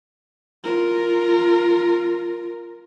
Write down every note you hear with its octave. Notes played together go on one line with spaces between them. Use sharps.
F4 A#4